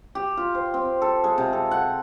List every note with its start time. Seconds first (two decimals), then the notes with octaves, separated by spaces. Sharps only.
0.15 G4
0.37 F4
0.55 C5
0.74 C4
1.02 A4
1.24 G#3
1.38 C3
1.53 A4
1.71 F#5